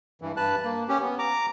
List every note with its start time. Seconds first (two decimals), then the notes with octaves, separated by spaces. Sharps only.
0.22 G2 E3
0.37 G2 B4 A5 F#6
0.64 A#3
0.88 C#4 G4
1.01 B3
1.19 A#5 D6